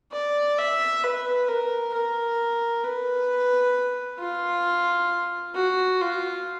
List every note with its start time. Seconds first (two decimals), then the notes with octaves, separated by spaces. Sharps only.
0.12 D5
0.58 E5
1.03 B4
1.48 A#4
1.93 A#4
2.84 B4
4.19 F4
5.55 F#4
6.01 F4